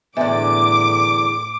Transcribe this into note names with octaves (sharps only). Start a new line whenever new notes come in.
E2 A2 D3 E5 D6